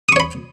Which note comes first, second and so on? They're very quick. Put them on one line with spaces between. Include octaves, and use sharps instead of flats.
D#6 C#6 C#5 B5